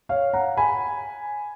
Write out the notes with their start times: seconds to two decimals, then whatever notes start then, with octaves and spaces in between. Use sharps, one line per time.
0.09 C#5 F5
0.33 F#5 A#5
0.57 G#5 B5